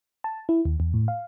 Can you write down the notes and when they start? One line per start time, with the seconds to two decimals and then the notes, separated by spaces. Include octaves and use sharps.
0.24 A5
0.49 E4
0.65 D#2
0.80 E2
0.94 A2
1.08 F5